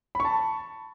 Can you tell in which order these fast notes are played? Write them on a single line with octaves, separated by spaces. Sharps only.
B5 C#6 A5